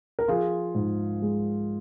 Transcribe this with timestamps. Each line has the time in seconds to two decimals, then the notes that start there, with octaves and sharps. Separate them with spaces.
0.19 A#4
0.28 F3 F4 G#4
0.75 G#2
1.22 G#3